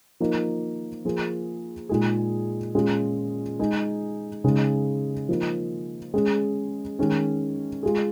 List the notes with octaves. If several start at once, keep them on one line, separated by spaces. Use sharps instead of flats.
F3 A#3 D#4
F3 A#3 F4 G#4
A#2 G#3 D#4 G#4
A#2 G#3 C#4 F4 G#4
G#3 D#4 G#4
C#3 G#3 D#4
F3 A#3 D#4
G#3 C#4 G#4
D#3 G#3 C#4
G#3 F4 G#4